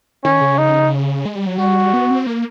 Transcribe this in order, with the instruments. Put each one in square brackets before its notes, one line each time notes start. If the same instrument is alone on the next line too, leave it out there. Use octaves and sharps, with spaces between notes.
[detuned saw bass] D#3 [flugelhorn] C#4
[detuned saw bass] C#3
[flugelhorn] D#4
[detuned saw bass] G#3
G3
F#3
[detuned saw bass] G3 [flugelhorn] F#4
[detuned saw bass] B3
C4
A#3